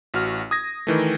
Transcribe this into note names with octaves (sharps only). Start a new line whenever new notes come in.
A1 F#4 F6
D#6 G#6 A#6
D#3 E3 A3